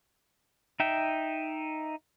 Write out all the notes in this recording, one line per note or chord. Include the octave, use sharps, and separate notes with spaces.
D#4 E5 G5